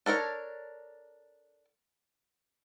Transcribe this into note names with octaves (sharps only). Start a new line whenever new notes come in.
D4 A4 A#4 C#5